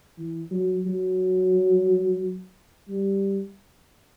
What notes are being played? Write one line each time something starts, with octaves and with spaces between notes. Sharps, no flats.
E3
F#3
F#3
G3